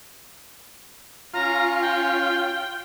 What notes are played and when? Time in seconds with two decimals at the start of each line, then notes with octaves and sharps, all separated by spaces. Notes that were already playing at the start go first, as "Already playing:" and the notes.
1.34 C#4 F4 A#5
1.82 G5